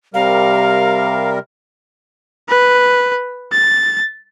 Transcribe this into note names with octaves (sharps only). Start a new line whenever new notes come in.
C3 G3 A#4 F5
B4
A6